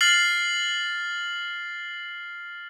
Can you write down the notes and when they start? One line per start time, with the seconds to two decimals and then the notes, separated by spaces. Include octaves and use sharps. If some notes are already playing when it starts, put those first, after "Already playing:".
0.01 F6 A6 C7 F#7